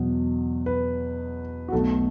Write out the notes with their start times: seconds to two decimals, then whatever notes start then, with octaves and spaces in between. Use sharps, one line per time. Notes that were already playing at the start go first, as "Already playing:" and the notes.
Already playing: E2 B2 F#3
0.66 B4
1.68 F#4
1.72 B1 B2 A3 A4